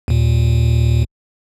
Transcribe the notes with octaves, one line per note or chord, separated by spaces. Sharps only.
D#2 A#2